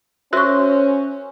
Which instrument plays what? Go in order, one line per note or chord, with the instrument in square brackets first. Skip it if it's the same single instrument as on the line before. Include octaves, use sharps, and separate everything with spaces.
[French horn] C#4 [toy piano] F#4 A#4 E5 [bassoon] C5 [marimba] C#6 F#6